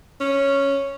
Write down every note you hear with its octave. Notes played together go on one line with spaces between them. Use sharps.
C#4